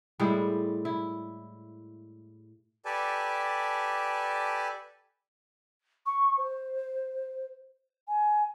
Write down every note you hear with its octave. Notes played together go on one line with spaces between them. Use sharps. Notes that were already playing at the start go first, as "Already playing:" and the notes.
A2 G3 G#3 E4
E4
G4 A4 B4 D5 G#5 A5
C#6
C5
G#5